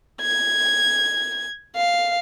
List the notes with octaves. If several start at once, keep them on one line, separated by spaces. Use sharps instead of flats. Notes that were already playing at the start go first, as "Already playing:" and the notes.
G#6
F5